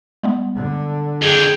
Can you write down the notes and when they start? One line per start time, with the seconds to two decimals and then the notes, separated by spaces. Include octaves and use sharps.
0.23 G3 G#3 B3
0.56 D3
1.22 F2 D3 G#4 G5